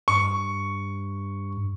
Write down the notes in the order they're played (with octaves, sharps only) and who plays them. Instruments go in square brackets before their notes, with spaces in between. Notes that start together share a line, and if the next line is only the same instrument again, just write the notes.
[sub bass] G2 [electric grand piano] C#6